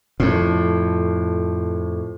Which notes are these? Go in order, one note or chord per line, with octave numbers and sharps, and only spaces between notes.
F2 A2